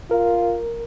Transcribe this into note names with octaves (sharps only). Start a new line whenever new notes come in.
F4 A#4